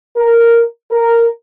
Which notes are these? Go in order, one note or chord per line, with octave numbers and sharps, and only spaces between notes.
A#4
A#4